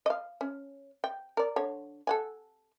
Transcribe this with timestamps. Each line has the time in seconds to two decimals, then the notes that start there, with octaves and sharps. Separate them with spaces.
0.06 D#5 F5
0.41 C#4
1.04 G5
1.37 A#4 D5
1.56 D3 C#5
2.07 A4 F#5 G#5